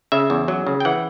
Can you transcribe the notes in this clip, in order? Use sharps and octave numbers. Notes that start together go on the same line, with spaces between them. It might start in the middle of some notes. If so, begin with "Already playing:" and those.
C#3 E5
E2
F#3
C#3
G5
E3 F#5